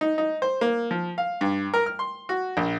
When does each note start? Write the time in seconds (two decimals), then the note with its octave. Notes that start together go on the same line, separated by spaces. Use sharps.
0.01 D#4
0.18 D#4
0.42 C5
0.61 A#3
0.91 F3
1.18 F5
1.41 G2
1.74 A#4
1.86 F6
1.99 C6
2.29 F#4
2.57 A#1